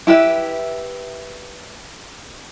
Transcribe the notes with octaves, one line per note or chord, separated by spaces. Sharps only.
E4 G4 B4 E5